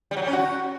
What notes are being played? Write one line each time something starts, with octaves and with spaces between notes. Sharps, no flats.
G3
F#3
G3
C#4
F#4